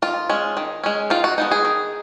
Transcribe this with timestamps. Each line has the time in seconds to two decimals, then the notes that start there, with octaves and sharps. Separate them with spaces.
0.02 D#3 F4
0.29 G#3 C#4
0.57 D#3
0.84 G#3 C#4
1.10 D#3 F4
1.24 F#4
1.38 G#3 B3 D#4
1.51 G#4
1.65 D#3